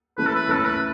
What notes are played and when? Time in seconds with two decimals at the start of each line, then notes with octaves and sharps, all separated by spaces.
0.18 E3 A3 C#4 B4
0.26 A4
0.35 B4
0.48 E3 A3 C#4 A4
0.65 B4